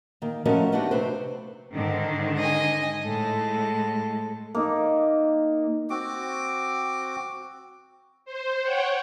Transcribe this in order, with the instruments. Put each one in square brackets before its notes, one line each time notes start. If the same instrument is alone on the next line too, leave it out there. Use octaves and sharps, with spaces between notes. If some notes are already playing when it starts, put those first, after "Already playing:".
[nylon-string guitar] D#3 A#3
F3 A3 C#4 F#4 A#4 D#5
A3 B3 D4 D#4 F#4 G4
C3 A3 C4 B4 C5
[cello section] G#2 D3 D#3
[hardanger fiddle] D#5 G#5
[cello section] A2 G#3 [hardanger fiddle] A4
[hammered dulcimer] A#3 D#4
[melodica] C4 F#4 D6
[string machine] C5
C#5 F#5 G5